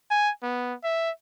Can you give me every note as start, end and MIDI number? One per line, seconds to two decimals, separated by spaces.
0.11 0.30 80
0.43 0.74 59
0.84 1.10 76